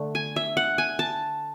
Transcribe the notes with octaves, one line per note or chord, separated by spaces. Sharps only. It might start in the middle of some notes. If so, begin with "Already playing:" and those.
Already playing: D3 A3
G#5
E5
F#5
G#5
A5